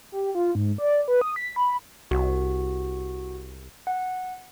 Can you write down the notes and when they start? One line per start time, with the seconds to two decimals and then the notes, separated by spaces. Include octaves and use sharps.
0.12 G4
0.35 F4
0.55 G#2
0.78 D5
1.08 B4
1.21 D#6
1.36 B6
1.56 B5
2.11 C2 F#4
3.87 F#5